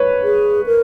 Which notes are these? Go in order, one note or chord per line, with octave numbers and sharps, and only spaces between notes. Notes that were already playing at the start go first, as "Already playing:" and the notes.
Already playing: B4 C#5
G#4
A#4